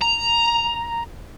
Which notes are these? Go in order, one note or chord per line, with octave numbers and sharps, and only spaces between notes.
A#5